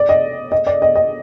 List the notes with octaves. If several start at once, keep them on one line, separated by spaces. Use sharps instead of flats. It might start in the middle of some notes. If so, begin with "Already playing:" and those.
Already playing: D5
D#5
D#5
D5
D#5
D#5